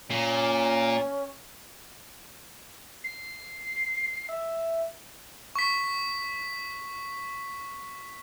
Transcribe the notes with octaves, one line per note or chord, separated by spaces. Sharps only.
A#2 C#4
C7
E5
C#6 B6